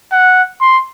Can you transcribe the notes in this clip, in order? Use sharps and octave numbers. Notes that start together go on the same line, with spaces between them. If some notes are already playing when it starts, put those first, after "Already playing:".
F#5
C6